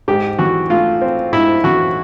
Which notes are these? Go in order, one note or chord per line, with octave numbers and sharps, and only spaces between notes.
G#2 G4
E3 F#4
A3 F4
C4
G#2 E4
E3 F#4